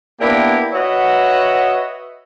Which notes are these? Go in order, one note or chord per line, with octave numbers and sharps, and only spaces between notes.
A#3 B3 D4 E4 G4 F5
F#4 B4 C#5 D#5 E5 F#5